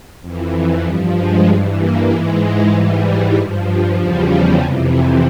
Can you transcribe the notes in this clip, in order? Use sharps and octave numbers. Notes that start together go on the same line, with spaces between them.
F2 E3
G2 F3 G3
G#3
G2 E3
A#3
G#2 E3 G#3
G#2 E3 G3
G2 F3
E2 C#3 F3 G3
F2 C3 E3